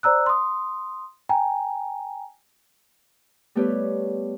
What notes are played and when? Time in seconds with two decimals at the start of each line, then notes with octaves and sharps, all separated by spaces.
0.03 C5 D5 A#5 E6 F#6
0.26 C6 D#6
1.29 G5 G#5 A#5
3.55 G3 A3 B3 G4 B4 C#5